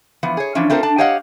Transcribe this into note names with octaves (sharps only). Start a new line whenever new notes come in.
E3 F3 B3
G#4 C#5
E3 F3 C#4 D4
A3 C4 F4 A#4 C5
D4 A5
G4 C#5 D#5 F5 F#5